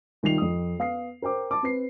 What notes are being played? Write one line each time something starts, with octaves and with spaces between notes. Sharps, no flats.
C2 D#3 F4 G5 C7 F7
F2 D#6
B3 F5 D#6 C7
A#4 C5 G5 D6
A5 D6
C4 B4 C7